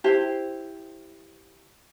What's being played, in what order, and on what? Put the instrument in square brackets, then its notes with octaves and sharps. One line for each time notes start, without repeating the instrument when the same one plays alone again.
[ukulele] E4 G4 C5